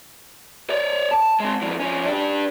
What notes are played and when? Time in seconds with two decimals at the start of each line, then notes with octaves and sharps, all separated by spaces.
0.70 C#5 D5
1.11 A5
1.40 G#3 C4
1.62 F2 E3
1.80 F3 C#4
2.06 D4 G4